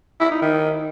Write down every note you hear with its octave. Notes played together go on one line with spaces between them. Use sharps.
E4
D#4
D#3